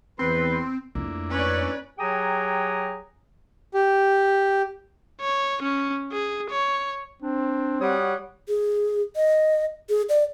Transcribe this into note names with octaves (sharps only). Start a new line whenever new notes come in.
E2 C4 B4 C6
F2 A3 A#3 D4 E4
C#4 B4 C#5 D5
F#3 G4 G#4 G5 A#5 D#6
G4
C#5
C#4
G#4
C#5
C4 D4
G3 F#4 C#5 F#5 D#6
G#4
D#5
G#4
D5